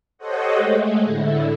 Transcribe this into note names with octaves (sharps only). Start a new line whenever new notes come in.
G4 A4 C5 C#5 D#5 F#5
G#3 A3
A2 D3 E4